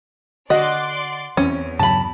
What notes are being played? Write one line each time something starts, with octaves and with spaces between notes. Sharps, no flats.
D3 F#4 D5 D#5 F#5 C6 D6
E2 E3 C4 C#4
G2 C#3 F#3 A5 B5